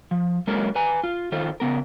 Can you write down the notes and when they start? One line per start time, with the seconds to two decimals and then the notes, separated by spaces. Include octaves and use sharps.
0.11 F3
0.47 F#3 G#3 A#3 C#4 A4 A#4
0.75 B4 G#5 A#5
1.04 F4
1.32 D#3 F4 A4 C5
1.60 C#3 B3 A#4